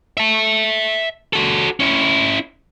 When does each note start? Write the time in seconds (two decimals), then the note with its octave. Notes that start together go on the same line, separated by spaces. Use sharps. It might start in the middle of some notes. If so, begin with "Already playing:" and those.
0.17 E5 A5
1.33 F#4 A4
1.80 C#4 E4